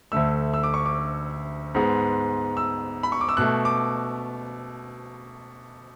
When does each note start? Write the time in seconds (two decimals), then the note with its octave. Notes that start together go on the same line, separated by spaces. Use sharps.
0.12 D2 D3 A3 E6
0.54 E6
0.63 D6
0.74 C#6
0.86 D6
1.75 G#2 G#3 B3
2.57 E6
3.03 B5
3.12 C#6
3.21 D6
3.29 E6
3.37 B2 A3 F#6
3.65 D6